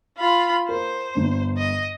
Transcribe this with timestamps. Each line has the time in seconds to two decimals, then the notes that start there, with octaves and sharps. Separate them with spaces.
0.18 F4 B5
0.69 A#4 C5
1.15 G1 D4
1.57 D#5